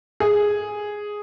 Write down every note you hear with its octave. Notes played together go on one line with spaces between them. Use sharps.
G#4